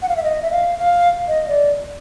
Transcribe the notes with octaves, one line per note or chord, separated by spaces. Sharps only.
F#5
F5
E5
D#5
E5
F5
F5
D#5
D5